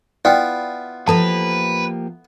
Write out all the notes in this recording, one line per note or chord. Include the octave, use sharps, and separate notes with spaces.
B3 E4 F4 D5 G5
F3 A#3 G4 A4 B4 A5